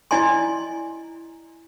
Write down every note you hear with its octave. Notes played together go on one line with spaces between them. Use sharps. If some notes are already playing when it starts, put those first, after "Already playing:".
E4 D5 D#5 G#5 C6